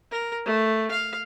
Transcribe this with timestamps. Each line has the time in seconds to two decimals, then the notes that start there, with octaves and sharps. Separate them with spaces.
0.12 A#4
0.46 A3
0.91 F5